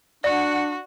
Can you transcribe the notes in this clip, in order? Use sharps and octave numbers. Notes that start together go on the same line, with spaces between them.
D4 F#4 D5 F#5